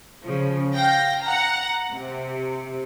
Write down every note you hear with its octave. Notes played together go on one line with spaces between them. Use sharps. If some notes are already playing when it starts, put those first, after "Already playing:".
C#3 F3
F5 G5 A#6
F#5 A#5
C3